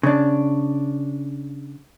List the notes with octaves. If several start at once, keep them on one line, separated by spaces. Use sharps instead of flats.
C#3 D4